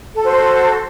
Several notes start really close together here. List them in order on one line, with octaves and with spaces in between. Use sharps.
A4 F#4 C5